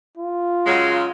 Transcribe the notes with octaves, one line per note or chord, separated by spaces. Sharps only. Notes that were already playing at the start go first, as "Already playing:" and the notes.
F4
C#3 F#3 G#3